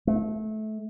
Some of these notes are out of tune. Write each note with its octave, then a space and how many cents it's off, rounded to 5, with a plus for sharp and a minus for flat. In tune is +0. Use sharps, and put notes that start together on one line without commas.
A3 -25